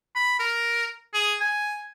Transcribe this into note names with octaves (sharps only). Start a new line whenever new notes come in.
B5
A#4
G#4
G#5